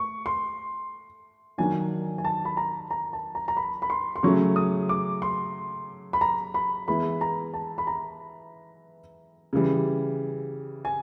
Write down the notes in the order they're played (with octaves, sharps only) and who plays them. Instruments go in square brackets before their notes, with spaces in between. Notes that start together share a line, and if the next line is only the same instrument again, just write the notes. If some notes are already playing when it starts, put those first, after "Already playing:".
Already playing: [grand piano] A3 [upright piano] C#6
[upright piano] C6
[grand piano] D#3 F#3 A#3 D4 [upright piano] G#5
[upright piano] G#5
A5
B5
A#5
A#5
A5
A#5
A#5
B5
B5
C6
C6
[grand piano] C#3 F#3 A3 C#4 [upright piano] C#6
[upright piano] D#6
D6
C6
B5
A#5
B5
[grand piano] E3 G#3 B3 E4 [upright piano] B5
[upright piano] A#5
A5
B5
A#5
[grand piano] C#3 E3 G3
[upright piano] G#5